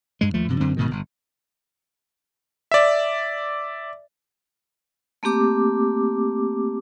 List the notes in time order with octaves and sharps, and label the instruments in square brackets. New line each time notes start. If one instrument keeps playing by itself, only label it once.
[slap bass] G2 G#3
D#2 F3 A3
G2 C3 F3
F#2 D3 C4
G#2 B2 D#3
G1
[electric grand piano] D5 E5
[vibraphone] A3 A#3 C4 G4 D6